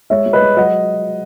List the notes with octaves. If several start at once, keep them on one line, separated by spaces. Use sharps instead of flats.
G#3 C#5 E5
G#3
B4 D#5
G#3
F#3 D#5 F#5